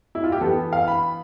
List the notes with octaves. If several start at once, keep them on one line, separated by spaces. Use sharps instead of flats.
E4
F4
G4
E3 B3 A4
F5
B5